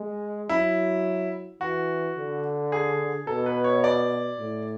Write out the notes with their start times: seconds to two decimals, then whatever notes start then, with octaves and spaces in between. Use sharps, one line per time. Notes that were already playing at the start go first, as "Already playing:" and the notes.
Already playing: G#3
0.49 F#3 E4
1.61 E3 F#4
2.17 D3
2.72 G#4
3.27 B2 A4
3.46 B4
3.64 C#5
3.84 D5
4.39 A2